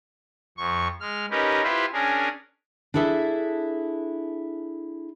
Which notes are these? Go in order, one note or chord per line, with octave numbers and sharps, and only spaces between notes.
F2 C#6
G#3 F6
C#4 D#4 G4 A#4 B4
E4 F4 G4 B4 C5 E5
C#4 D4 G#4 A#4
D4 E4 G#4 A4 E5